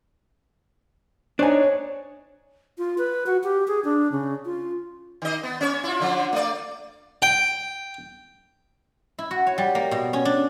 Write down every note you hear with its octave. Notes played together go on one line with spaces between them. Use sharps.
D4 D#4 C5 C#5 G#5
F4
B4
F#4
G4
G#4
D4
C#3
F4
D#3 D#5
B3
C#4 C#5
E4 F4
D3 F3
A3 D5
G5
E4
F#4
C#5
G3
A#3
B2
C#4
D4